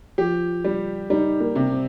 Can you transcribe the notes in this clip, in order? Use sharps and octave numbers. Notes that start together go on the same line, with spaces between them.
F3 G4
G3
G3 D#4
A#3
C3
C4